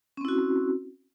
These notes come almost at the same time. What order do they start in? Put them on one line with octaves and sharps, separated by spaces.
C#4 C4 E4 F#4